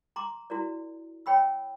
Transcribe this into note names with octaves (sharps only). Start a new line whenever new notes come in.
A#5 C6 D6
E4 F#4 A#4 D5
C#5 G5 B5 E6